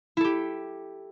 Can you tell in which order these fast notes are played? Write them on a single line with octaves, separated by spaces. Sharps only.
E4 A4 G4